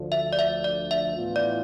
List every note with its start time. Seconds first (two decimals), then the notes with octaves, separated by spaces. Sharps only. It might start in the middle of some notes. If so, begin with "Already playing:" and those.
Already playing: D2 D3 F3
0.12 E5
0.33 D5
0.39 E5
0.64 D5
0.91 E5
1.16 A2 E3 B3 F4
1.36 D5